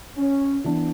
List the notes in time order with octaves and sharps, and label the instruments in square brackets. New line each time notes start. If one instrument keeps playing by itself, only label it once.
[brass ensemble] C#4
[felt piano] E3 B3 D4